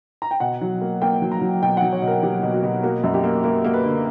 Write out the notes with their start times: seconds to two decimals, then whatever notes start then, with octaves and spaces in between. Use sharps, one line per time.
0.22 A#5
0.31 G5
0.40 B2 F#5
0.61 F#3
0.81 A#3
1.02 A#3 G5
1.22 F#3
1.32 A#5
1.41 F#3
1.62 B2 G5
1.77 F#5
1.82 F#3
1.92 C#5
2.02 B2
2.07 A#4
2.23 F#3 G4
2.43 B2
2.54 F#4
2.63 B2
2.83 A#3 F#4
3.04 F#2
3.14 G4
3.24 A#3
3.44 A#3 A#4
3.65 A#3
3.74 B4
3.84 D3